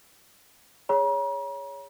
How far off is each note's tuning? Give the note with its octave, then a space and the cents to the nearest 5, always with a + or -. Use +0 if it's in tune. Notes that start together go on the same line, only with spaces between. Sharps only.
G#4 -15 C#5 +10 A#5 +40